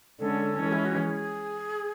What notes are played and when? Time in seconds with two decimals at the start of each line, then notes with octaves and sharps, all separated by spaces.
0.20 D3 G#3 C#4 A4
0.58 E3 G#3 C#4
0.73 E4
0.85 F#4
0.97 G#4